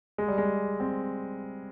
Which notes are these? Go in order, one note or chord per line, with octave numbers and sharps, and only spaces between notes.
G#3
G3
G#3
C4